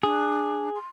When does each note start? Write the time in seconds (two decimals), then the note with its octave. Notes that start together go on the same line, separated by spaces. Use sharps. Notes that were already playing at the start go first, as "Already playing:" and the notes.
0.03 D4 G#4
0.75 C6